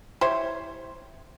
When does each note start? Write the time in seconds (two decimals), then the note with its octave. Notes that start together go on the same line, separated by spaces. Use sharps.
0.21 E4 G4 C5 C#5